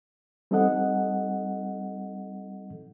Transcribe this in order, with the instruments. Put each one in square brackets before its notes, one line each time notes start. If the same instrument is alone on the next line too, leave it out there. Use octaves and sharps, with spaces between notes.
[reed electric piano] G3 C4 D#4 A4 D#5 F#5